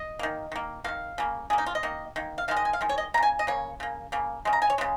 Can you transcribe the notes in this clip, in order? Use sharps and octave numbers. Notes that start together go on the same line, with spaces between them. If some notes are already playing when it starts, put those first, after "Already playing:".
Already playing: D#5
D#3 A#3
D#3 A#3
D#3 A#3 F5
C#3 A#3
C#3 A#3 G#4
D#4
F4
D#5
D#3 A#3
D#3 A#3
F5
D#3 G#3 F5
D#5
G#5
F5
D#3 G#3
C#5
D#5
A#3 A#5
C#3 G#5
D#5
C#3 A#3 C#5
C#3 A#3
C#3 A#3
C#3 G#3
A#5
G#5
C#5
C#3 G#3